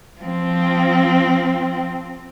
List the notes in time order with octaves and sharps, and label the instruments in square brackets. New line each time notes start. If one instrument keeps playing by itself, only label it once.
[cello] F3 C4